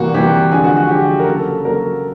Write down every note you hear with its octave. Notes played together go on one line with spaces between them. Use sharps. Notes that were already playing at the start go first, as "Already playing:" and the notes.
Already playing: C3 E3 G3 A#3 F#4
C3 E3 G3 A#3 G4
D3 F3 G#3 G#4
F#4
F#4
D3 F3 G#3 G4
A#4
C#3 F#3 A#3 A4
C#3 F#3 A#3 A#4